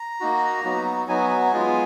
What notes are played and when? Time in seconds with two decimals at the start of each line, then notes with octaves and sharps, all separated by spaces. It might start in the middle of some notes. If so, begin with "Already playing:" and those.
Already playing: A#5
0.20 A#3 D#4 F#4
0.64 F#3 B3 D#4 F#4
1.08 F#3 B3 D#4 F#4 G#5
1.52 G#3 B3 F4